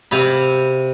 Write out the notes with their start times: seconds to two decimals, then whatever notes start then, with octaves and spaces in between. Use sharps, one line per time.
0.11 C3 F5 B5